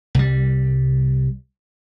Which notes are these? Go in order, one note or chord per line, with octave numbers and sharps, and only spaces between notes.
C2 G3